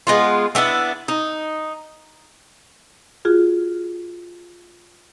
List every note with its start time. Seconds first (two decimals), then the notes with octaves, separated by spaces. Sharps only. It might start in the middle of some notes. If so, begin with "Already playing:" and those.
0.07 G#3 B3 F4
0.55 A3 B3 D4 E4
1.08 D#4
3.25 F4 F#4 G#4